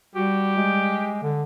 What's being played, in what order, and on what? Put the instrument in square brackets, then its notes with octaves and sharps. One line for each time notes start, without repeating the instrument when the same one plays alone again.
[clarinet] G3 [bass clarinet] F#4 [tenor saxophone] G4
[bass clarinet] G#3
D3